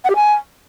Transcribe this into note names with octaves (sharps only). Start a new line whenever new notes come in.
F#5
G4
G#5